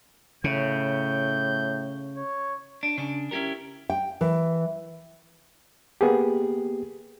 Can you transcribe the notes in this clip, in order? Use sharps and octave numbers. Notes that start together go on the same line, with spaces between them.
A2 C#3 G6
C#5
D4
C#3 D4
C#4 E4 F4 G4 A#4
G5
E3
A#3 B3 G4 G#4